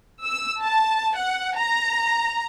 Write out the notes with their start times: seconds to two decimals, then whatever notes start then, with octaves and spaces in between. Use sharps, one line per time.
0.24 E6
0.62 A5
1.17 F#5
1.58 A#5